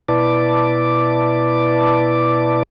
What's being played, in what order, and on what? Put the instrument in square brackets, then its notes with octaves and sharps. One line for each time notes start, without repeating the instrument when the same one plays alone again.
[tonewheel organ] B2 E4 B4 D5 A5 D6